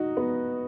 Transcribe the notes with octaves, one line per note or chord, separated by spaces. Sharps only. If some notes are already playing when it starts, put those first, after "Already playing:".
Already playing: D#4 F#4
B3